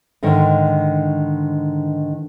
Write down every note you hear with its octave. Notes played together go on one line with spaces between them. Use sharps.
G#2 D3 D#3